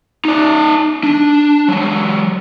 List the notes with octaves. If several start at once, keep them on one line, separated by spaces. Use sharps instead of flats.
D#4 D5
D4
F#3 G#3